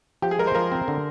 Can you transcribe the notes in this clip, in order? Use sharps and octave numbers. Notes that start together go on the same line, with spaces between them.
F3 G4
G#4
G#3 A#4
C5
F3 A#4
C4
D3